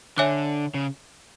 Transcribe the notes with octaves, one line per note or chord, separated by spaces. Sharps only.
D3 C#5 E5 G#5 D6 F#6
C#3